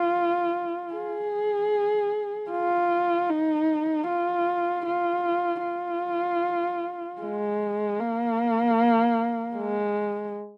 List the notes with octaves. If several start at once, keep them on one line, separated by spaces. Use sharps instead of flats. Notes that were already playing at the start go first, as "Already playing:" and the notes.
Already playing: F4
G#4
F4
D#4
F4
F4
F4
G#3
A#3
G#3